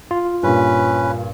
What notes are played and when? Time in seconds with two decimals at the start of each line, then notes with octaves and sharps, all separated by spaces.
0.11 F4
0.43 G2 A#2 C#4 B4